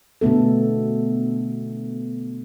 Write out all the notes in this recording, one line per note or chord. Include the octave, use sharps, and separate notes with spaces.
B2 D3 A3 B3 A4